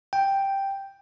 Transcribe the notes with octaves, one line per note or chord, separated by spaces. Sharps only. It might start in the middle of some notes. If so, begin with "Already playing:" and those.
G5